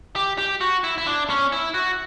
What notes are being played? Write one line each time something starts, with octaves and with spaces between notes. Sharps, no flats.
G4
G4
F#4
E4
E4
D4
C#4
E4
F#4